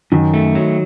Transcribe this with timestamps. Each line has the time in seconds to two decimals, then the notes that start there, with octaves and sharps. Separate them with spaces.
0.12 F#2 D#3
0.34 A3
0.55 F#3